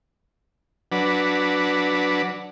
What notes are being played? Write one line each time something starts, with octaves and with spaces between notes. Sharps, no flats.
F#3 D4 B4